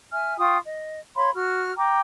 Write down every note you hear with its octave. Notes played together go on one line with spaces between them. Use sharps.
E5 G#5 F6
F4 G5 C#6 D#6
D#5
C#5 F5 B5 C6
F#4 F6
G5 A#5 D6